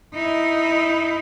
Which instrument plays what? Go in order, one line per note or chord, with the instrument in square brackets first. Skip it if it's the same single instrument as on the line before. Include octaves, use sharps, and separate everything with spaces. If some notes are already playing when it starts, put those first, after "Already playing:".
[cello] D#4 E4